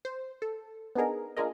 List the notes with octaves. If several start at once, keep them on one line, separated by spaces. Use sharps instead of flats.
C5
A4
B3 D4 D#4 G#4 A#4
A#3 D4 F4 G#4 A#4 D#5